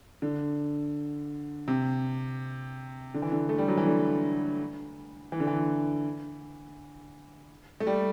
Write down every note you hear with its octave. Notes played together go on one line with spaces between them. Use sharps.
D3
C3
D3
E3
D3
A3
G3
F#3
E3
D3
E3
D3
E3
A3
G3